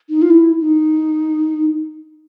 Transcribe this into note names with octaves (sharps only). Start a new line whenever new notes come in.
D#4
F4
E4
D#4